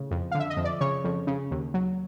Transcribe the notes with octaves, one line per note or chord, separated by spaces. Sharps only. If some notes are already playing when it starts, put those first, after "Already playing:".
Already playing: A2 C#3
F2
D3 F5
E5
D#5
F2
D5
C#3 C#5
F2
C#3
D#2
F#3